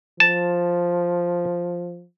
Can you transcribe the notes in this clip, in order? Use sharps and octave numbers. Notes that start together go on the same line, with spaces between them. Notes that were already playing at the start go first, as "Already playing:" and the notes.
F3 A5